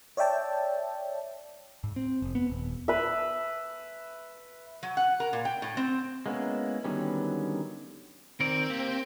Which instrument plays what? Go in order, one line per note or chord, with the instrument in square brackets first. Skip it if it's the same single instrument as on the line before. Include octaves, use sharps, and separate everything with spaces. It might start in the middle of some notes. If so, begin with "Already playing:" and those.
[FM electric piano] C#5 D5 E5 G5 A5
[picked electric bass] G#2
C4
F1
B3
D#1
[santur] B4 E5
[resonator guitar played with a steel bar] F#3
F#5
A#4
A#2
G5
A2
C4
[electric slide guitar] G#3 A#3 B3 C#4 E4
D3 D#3 F#3 G3 B3 C#4
[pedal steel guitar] D#3 A#4 D5 [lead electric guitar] C4
[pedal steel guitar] A#3 G4